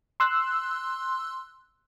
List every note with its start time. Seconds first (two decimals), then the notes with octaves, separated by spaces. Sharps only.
0.20 C6 E6 F#6